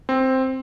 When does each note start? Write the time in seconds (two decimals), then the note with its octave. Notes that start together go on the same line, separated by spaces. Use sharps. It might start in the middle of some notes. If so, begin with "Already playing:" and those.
0.09 C4